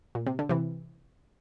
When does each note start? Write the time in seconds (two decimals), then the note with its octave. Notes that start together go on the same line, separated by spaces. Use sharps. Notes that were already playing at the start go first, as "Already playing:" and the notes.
0.15 A#2
0.27 C3
0.39 D3
0.49 C3 E3